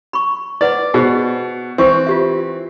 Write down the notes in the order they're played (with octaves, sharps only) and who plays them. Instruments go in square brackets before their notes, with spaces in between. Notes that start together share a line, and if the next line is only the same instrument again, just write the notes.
[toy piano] B5 C#6
[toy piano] E4 B4 F#5 [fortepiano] D5
[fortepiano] B2 [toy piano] G#4 C5
[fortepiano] E3 C4 [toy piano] E5 C#6
[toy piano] F4 G4 E5